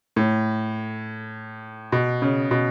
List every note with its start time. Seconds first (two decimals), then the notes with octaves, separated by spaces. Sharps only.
0.16 A2
1.92 B2
2.22 C#3
2.51 B2